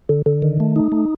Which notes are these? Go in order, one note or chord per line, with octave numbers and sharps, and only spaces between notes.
D3
D3
D#3
A3
D#4
A3